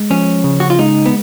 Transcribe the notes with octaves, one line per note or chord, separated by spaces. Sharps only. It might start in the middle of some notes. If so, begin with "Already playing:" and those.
Already playing: G#3
F3 C#4
C#3
F#4
F4
G#3 D#4
B3